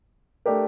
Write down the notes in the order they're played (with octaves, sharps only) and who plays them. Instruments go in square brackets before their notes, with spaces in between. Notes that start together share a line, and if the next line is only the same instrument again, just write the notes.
[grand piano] A3 D4 G4 A#4